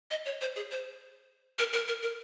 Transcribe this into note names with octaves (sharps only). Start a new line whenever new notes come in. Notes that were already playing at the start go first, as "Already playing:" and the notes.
D#5
C#5
C5
G#4
C5
A#4
A#4
A#4
A#4